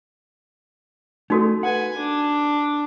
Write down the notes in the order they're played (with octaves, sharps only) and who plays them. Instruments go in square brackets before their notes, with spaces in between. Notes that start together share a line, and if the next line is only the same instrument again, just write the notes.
[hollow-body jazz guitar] A3 [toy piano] D#4 F#4 A4
[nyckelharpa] B4 G#5 [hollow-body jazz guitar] F#5
[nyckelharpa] D4